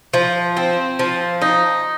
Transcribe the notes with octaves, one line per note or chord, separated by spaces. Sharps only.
F3
C4
F3
D#4